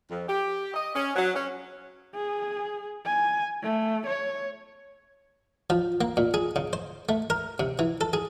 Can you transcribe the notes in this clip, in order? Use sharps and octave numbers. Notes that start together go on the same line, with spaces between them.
F2
G4
D#5
C#4
F#3
C#4
G#4
G#5
A3
C#5
F3
A#3
A#2
G#4
C#3
C5
A3
A#4
C3
E3
A4
G#4